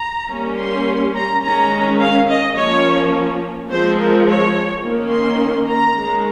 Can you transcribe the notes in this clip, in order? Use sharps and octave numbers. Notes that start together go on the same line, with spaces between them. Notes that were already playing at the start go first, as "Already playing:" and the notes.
Already playing: A#5
G3 A#3 C#4
C6
A#5
D#3 G#3 C#4 A#5
F5
D#5
F3 A#3 C#4 C#5
F3 G#3 C4 C5
A#4
C#5
D#3 A#3 C#4
C6
A#5
D#3 G#3 C#4